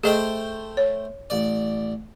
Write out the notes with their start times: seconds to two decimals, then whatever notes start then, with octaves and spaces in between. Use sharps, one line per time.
0.04 A3 G#4 A4 C5 D#5 G5
0.77 C#5
1.30 A1 D5